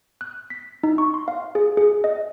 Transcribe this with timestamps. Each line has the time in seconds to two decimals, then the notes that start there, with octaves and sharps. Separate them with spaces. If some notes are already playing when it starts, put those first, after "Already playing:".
0.21 F#6
0.50 B6
0.83 D#4
0.98 C#6
1.14 C6
1.28 F5
1.55 G#4
1.77 G#4
2.04 D#5